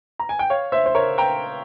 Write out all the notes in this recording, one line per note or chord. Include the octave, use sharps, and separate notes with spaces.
A#5
G#5
G5
C#5 F5
C5 E5
C5
A#4 C#5
G5 A#5